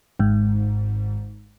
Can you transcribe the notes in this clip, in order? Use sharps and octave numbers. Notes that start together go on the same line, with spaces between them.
G#1 G#2